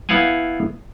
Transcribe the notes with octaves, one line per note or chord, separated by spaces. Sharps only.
B3 E4 F5 F#5 G#5